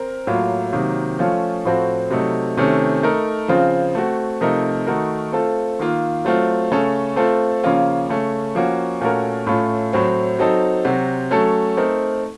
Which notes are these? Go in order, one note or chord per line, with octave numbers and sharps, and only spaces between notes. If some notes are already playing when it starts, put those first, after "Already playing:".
Already playing: C4 A#4
A2 F#3 A#3 F4
C3 D#3 F#3 A#3
F3 A3 C#4 F4
A2 F3 C4 F#4 A4
C3 F#3 A3 D#4
C3 D#3 A3 C#4
A3 D#4 A#4
C#3 F3 C4 F4
A3 C4 F#4
C3 F3 A3 D#4 A#4
D#3 A3 D#4 F#4 A#4
A3 C4 F4 A4
D#3 A#3 F4
F#3 A3 C4 F4
C#3 A3 C#4 A4
A3 C4 F4 A4
C#3 F3 A#3 C#4 F4
C#3 A3 C#4
F3 A#3 C#4 F#4
A#2 A3 C#4 F#4 A#4
A2 A3 C#4 F4
A2 F#3 C4
F#3 C4 D#4 A4
C3 F#3 C4 F#4
F#3 A3 C#4 A4
A3 C4 D#4 A#4